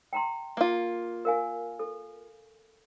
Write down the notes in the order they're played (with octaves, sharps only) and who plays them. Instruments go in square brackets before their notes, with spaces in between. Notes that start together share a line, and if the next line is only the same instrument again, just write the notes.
[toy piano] G5 A#5 C6
[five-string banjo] A#3 F4
[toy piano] A#4 F5 G#5
A4